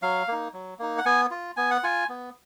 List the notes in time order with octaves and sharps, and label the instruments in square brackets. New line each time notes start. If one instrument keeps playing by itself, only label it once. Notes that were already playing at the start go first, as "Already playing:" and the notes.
[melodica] F#3 F5
A#3 D#4
F#3
A#3 D#4
F#5
B3 G#5
F4
B3 G#5
F#5
F4 G#5
B3